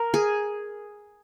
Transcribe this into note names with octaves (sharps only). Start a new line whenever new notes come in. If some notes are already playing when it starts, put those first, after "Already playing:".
Already playing: A#4
G#4